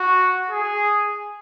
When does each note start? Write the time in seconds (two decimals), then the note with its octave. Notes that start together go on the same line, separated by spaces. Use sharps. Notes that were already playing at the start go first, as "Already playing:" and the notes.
Already playing: F#4
0.50 G#4